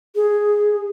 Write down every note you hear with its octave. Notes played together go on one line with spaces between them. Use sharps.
G#4